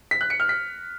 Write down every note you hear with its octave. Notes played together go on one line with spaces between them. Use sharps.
B6
F#6
C#7
F6
B6